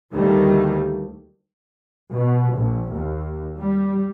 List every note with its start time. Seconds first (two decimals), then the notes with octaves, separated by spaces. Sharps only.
0.13 D2 D#3 G3 A3 A#3
2.12 B2
2.55 A#1
2.93 D#2
3.58 G3